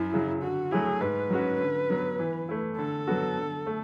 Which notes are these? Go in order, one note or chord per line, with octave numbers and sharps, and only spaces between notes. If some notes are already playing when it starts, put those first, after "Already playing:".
Already playing: F#2 E4
C#3 F#3
D3 F#4
F#3 A3 E4 G#4
G#2 B4
F#3 C#4 F#4
D3
F#3 B3
E3
A3 E4
D3 A4
F#3 B3 F#4
D3
A3